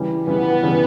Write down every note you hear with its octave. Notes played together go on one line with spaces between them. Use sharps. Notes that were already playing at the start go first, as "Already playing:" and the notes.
Already playing: C#3 E3 G3
C#3 E3 G3 B3
C#3 E3 G3